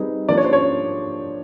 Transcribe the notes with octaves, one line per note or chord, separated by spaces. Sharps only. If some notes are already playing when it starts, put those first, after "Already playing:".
Already playing: G3 C4 D#4 G#4 B4
F3 A#3 D4 G4 D5
C#5
C5
C#5